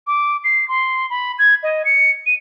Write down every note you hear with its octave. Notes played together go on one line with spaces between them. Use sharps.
D6
C7
C6
B5
G#6
D#5
C#7
D#7